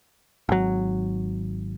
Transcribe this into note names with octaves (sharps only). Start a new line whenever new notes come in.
G#1 F#3